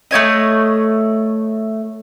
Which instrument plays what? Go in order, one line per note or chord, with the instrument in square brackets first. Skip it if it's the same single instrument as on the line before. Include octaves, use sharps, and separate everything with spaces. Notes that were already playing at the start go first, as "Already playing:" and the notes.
[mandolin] A3 E4 C#5 D#5